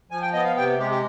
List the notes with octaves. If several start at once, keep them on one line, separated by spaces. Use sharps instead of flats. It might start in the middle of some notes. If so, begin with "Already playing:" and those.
F3 G#5
G5
B3 D#5
F5
C3 G5
G#3 G4
G4